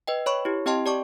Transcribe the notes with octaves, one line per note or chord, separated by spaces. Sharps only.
B4 D#5 G5
C#5 B5 C#6
E4 G4
C4 G4 D#5 G5 A5 C6
G4 D5 A5 C#6 D6